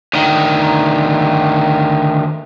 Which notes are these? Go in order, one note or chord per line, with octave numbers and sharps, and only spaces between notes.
D2 D#3